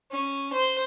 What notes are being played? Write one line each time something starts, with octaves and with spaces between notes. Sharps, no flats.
C#4
C5